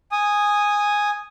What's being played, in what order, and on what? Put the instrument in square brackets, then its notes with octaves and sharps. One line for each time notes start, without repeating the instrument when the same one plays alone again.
[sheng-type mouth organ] G#5 D#6